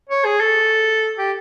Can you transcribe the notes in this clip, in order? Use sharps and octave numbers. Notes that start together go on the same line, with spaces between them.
C#5
G#4
A4
G4